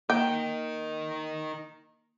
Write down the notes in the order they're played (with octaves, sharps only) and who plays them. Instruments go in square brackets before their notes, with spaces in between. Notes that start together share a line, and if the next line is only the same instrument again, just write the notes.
[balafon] A#3 [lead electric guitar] D#4 A#4 [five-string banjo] G5